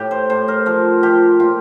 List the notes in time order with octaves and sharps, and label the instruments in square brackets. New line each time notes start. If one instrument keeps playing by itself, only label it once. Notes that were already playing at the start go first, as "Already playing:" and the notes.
Already playing: [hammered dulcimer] A2 G4
C5
A2 C5
A#4
F3 A#4
F3 G4
A#2 F4